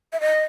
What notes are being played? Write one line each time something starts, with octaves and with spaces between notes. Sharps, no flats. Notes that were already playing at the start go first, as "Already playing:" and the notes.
E5
D#5